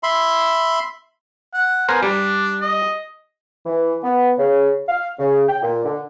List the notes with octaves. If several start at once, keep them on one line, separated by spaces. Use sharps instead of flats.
E5 B5 C6
F#5
B3 A#4 C5 G#5
G3 D4
D#5
E3
B3
C#3
F5
C#3
G5
A#2
D3